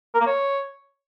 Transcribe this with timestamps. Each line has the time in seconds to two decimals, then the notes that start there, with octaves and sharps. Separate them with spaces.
0.14 A#4
0.21 A#3
0.27 C#5